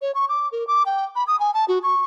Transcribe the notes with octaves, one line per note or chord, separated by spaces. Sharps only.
C#5
C#6
D6
A#4
D6
G5
B5
D#6
G#5
A5
F#4
C#6